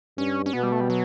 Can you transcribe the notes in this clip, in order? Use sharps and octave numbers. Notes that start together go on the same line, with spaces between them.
G2 C#4
C#4
B2 B3
G3
A3
G3
F#3